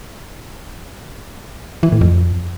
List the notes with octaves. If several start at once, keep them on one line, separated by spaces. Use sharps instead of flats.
E3
A2
F2